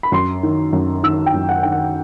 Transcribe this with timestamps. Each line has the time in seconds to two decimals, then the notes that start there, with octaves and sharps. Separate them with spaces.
0.03 B5
0.12 F#2 C6
0.43 D#3
0.73 F#2
1.03 D#3 E6
1.26 G5
1.34 F#2
1.49 F#5
1.63 D#3 G5
1.72 F#5